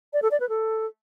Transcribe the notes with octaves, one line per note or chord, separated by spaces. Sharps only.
D5
A4
D5
B4
A4